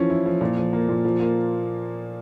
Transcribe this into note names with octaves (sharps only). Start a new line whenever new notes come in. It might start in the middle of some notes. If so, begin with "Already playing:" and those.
Already playing: E3 F3 C#4
E4
F3
A#2
F3
A#3
A#2
F3
A#3